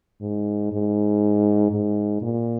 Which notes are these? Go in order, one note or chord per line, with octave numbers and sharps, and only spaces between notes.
G#2
G#2
G#2
A#2